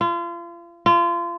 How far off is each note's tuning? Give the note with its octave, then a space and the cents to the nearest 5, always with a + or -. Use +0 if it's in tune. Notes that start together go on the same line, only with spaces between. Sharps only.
F4 -35
F4 -30